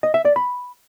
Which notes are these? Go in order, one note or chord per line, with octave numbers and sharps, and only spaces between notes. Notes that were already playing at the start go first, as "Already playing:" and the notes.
D#5
E5
D5
B5